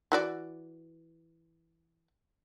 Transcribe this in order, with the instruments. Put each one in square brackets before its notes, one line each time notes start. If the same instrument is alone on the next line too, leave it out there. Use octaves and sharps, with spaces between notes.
[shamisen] E3 F#4 D5